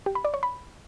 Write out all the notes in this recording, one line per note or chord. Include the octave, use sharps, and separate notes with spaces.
G4
B5
D5
C#5
B5